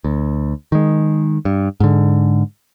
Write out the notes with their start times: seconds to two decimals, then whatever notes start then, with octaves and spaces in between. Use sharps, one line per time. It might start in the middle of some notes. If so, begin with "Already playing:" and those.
0.04 D2
0.72 D#3 G#3
1.45 G2
1.80 G#2 D3